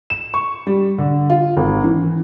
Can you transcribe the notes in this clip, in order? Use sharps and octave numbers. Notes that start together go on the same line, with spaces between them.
E7
C#6
G3
D3
F4
G#1
E3